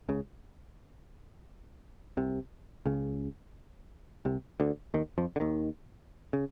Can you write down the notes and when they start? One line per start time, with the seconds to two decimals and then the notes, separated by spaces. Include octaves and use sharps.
0.09 C#2 C#3
2.17 C2 C3
2.86 C#2 C#3
4.25 C2 C3
4.60 D2 D3
4.94 D#2 D#3
5.18 F2 F3
5.36 D3
5.40 D#2 D#3
6.33 C#3